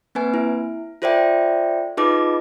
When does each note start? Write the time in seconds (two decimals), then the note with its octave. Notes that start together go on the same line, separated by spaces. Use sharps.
0.15 A#3 C4 B4 G#5
0.34 E4
1.02 F4 A4 C5 D5 E5 G5
1.97 D#4 F4 G#4 B4 D#5 D6